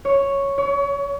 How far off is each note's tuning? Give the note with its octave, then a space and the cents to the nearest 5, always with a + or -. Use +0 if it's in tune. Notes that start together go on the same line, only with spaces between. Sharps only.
C#5 +0
C#5 +30